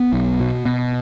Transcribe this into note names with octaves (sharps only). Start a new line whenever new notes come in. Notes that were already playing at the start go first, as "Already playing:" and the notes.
Already playing: B3
B1
B2
B2